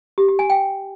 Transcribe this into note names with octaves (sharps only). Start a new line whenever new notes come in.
G4
G4
G#5
G5